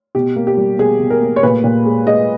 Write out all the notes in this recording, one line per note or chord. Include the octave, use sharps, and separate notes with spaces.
B2 G4
A#3
G4
G3
B2 G#4
B2
A#4
A#3
C#5
A#2 B4
A#2
G#3
G#3 D#5